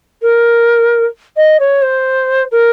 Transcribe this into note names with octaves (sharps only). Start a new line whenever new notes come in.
A#4
D#5
C#5
C5
A#4